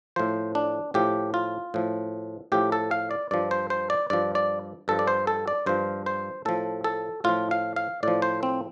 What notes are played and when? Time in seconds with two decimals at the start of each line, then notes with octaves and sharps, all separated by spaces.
0.16 A2 F3 C5
0.55 D4
0.94 A2 F3 G4
1.34 F4
1.74 A2 F3
2.52 A2 F3 G4
2.72 A4
2.91 F5
3.11 D5
3.31 G2 F3 D5
3.51 C5
3.70 C5
3.90 D5
4.10 G2 F3 D5
4.35 D5
4.88 G2 F3 A4
4.99 D5
5.07 C5
5.27 A4
5.48 D5
5.66 G2 F3 C5
6.06 C5
6.45 A2 F3 A4
6.84 A4
7.24 A2 F3 F4
7.51 F5
7.76 F5
8.03 A2 F3 D5
8.22 C5
8.43 C4